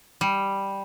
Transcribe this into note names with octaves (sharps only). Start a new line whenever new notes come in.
G3